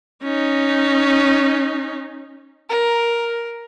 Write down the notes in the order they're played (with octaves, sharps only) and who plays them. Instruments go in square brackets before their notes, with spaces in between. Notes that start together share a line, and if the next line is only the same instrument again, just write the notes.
[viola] C#4 D#4
[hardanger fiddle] A#4